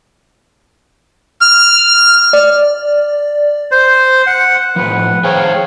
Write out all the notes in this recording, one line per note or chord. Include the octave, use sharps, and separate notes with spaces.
F6
D5
C5
F#5
A2 F3 B4 F#5
G#4 C5 C#5 F5 G5